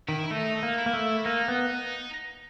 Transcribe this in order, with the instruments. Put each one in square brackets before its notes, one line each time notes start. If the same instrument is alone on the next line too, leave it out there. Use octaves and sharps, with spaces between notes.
[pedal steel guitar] D#3 [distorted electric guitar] E4
[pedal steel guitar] A3 [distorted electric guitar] D#4
[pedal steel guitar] A#3
[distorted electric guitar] E4
[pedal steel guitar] A#3
A3
[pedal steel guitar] A#3 [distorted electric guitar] D#4
[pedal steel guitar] B3